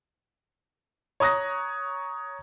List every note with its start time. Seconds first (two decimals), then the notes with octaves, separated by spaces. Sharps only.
1.20 C#5 A#5 D#6 F#6 A#6